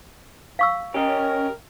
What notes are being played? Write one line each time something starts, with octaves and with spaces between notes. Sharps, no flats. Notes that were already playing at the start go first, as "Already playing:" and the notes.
F5 C#6 E6
C#4 G4 A#4 D#5